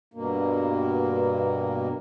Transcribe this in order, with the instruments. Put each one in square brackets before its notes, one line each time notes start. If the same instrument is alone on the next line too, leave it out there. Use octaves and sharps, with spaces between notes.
[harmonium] G2 B2 A#3